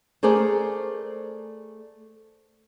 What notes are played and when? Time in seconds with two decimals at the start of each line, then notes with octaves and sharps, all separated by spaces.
0.23 A3 G#4 A#4 C5 D5